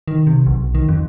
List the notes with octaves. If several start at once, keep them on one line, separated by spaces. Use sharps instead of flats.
D#3
C3
B1
D#3
F2